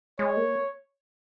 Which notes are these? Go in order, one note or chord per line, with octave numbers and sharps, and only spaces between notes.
G#3 C#5
A#3